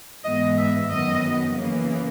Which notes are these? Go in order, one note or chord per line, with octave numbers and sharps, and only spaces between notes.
G#2 E3 B3 D#5
E5
F#2 D#3 F#3 B3 D#5
C#3 E3 A#3